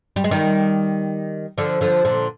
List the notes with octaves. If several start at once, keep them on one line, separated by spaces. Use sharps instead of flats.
G3
G#3
D#3 G3
D3 F3
D3 F3
A#2 D3